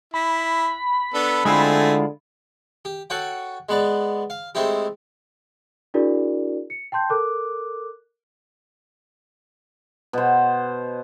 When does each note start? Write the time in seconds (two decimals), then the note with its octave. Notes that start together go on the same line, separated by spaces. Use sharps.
0.14 E4 B5
1.14 B3 D4 A4
1.45 D3 G#3 A3 C4 E4 F4 G#5
2.85 G4
3.10 F#4 A4 C#5 F#5 G5
3.69 G#3 B3 B4 D5
4.30 F5
4.55 G#3 A3 C4 D#4 E4 G4
5.94 D4 E4 F#4 G#4 A#4 D5
6.70 C#7
6.92 G5 A5 C6 G6
7.10 A4 A#4 D6 F#6
10.13 B2 C5